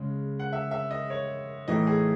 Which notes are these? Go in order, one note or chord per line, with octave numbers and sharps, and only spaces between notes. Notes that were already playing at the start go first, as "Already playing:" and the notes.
Already playing: C#3 G#3 C#4
F#5
E5
E5
D#5
C#5
A2 E3 A3 D#4 D#5
G#4